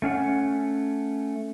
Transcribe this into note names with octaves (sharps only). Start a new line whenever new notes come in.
A3 C#4 F5 F#5